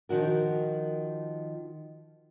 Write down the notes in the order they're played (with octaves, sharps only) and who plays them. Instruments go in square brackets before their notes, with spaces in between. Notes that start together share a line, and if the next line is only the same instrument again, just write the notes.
[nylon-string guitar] D#3 F3 F#4 A#4